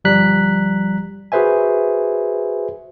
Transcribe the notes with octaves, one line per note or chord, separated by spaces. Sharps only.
G1 F3 G3 A#5 F#6 B6
F#4 G#4 B4 C5 E5 G#5